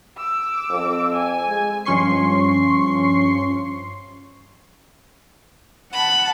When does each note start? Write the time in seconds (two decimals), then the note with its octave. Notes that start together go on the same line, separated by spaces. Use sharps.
0.17 D6 E6
0.70 F2
1.12 G#5
1.48 G#3
1.85 G2 F3 C#4 C6 C#6 C7
5.93 F#5 A5 B5